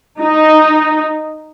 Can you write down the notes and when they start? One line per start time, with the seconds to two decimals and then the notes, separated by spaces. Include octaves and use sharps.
0.21 D#4